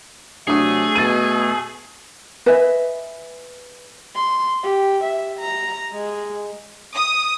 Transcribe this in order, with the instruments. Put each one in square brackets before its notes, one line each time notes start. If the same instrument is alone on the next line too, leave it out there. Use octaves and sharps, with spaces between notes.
[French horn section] C3 F#3 [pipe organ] A3 [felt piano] D4 D#6 [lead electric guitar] G#4
[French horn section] B2 [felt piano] A6 D#7
[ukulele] B4 D#5 E5 G#5
[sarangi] C6
G4
E5
A#5
G#3
[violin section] D#6